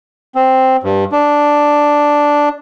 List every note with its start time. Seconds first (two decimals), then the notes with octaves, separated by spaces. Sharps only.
0.35 C4
0.83 G2
1.12 D4